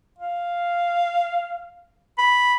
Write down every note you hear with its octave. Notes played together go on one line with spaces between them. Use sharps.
F5
B5